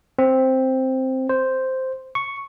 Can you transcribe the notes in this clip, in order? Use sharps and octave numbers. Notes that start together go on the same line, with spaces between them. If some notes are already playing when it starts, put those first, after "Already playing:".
C4
C5
C#6